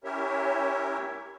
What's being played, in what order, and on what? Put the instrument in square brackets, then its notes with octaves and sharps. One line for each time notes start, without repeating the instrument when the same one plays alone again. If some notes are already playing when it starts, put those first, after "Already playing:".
[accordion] C#4 E4 G4 A#4 C#5 E5